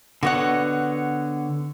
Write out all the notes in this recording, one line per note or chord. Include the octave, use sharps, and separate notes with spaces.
D3 B3 F#4 C#5 D#5 F#5